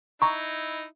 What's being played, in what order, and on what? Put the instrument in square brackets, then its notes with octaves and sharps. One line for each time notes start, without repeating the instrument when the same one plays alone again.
[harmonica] D#4 E4 [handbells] A#5 C#6